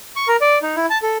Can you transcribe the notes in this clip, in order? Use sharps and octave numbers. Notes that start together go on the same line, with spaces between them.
C#6
A#4
D5
D#4
E4
A5
A4